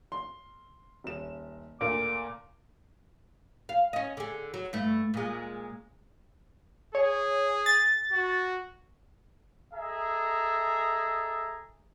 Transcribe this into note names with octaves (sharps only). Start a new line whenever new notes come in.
C6
D#1 E7
D2 A#2 D6
F5
C#4 D#5
D3 G#4
F#3
G2 A3
A#2 G#3
G#4 C#5
A6
F#4
G#4 A4 D#5 E5 A#5